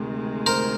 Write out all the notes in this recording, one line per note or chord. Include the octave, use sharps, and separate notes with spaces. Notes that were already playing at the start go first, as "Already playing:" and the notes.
Already playing: D2 C3 D#3 G#3
A#4 C5